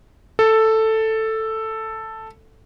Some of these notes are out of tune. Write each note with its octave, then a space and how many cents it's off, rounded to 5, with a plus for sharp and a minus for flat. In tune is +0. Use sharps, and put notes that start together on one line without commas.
A4 +5